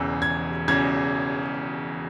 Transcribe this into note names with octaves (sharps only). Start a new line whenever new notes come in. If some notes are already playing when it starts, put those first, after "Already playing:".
Already playing: E1 E2 C#3 E6
G#6
E1 E2 C#3 G#6